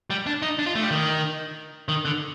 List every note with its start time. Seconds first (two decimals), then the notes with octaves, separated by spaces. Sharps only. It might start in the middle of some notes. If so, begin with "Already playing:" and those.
0.10 G3
0.27 D4
0.42 D#4
0.59 D4
0.66 F4
0.75 A3
0.83 G3
0.91 D#3
1.89 D#3
2.05 D3